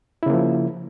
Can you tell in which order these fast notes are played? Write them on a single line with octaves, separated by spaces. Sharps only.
E4 C#3 A#3 F3